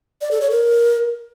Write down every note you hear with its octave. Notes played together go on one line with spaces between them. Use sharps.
D5
A4
C#5
A#4